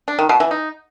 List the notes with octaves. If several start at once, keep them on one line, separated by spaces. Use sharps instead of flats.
D4
D#3
B2
E3
D#4